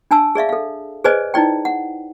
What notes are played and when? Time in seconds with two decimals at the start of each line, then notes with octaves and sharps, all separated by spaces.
0.11 D4 G#5 A5 E6
0.35 G#4 D5 E5 F5
0.49 A4 F5
1.04 G#4 B4 C5 D5 D#5 G#5
1.34 D#4 E4 D5 G5
1.65 F#5